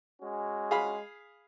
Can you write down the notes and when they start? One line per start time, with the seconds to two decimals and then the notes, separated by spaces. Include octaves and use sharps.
0.21 G#3 C#4 F#4
0.71 G#4 F5 B5